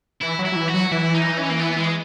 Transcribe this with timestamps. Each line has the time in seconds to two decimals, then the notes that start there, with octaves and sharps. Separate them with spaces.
0.22 E3 E4
0.39 F#3
0.45 E4
0.52 F#3
0.56 E3
0.68 F#4
0.74 F#3
0.92 E3 E4
1.14 D#4
1.38 C#4
1.50 A#3
1.60 B3
1.78 G#3